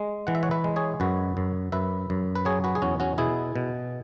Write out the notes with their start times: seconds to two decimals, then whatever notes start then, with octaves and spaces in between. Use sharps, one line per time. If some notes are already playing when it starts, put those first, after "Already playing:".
Already playing: G#3
0.27 E3 F#5
0.35 E5
0.43 C#5 F#5
0.51 B4 E5
0.64 G#3
0.76 G#4 C#5
1.00 F#2 F#4 B4
1.37 F#2
1.72 F#2 B4 E5
2.10 F#2
2.35 B4
2.45 F#3 G#4 C#5
2.64 F#4 B4
2.75 G#4
2.82 E2 C#4 F#4
3.00 C#4 F#4
3.18 B2 E4 G#4
3.56 B2